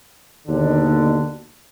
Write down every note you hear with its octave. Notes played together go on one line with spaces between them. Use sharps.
D#2 B2 D3